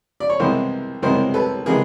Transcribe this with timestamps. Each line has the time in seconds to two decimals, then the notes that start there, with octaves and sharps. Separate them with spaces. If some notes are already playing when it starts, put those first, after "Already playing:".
0.20 D5
0.30 C#5
0.39 C2 C3 E3 G#3 B3 A#4 C5
1.02 C2 C3 E3 G#3 B3 A#4 C5
1.34 A4 B4
1.66 C3 E3 G#3 B3 G#4 A#4